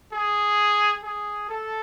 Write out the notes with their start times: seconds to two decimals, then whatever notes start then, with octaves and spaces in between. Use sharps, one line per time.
0.13 G#4
1.03 G#4
1.49 A4